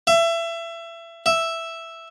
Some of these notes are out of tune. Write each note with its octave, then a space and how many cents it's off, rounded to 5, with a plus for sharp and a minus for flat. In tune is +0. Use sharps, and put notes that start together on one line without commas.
E5 +25
E5 +0